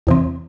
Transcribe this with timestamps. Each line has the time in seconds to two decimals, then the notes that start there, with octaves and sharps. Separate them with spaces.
0.07 E2 C3 E3 C4